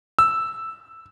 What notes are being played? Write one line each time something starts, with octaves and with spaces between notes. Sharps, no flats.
E6